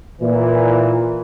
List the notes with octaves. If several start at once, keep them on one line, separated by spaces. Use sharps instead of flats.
A#2 E3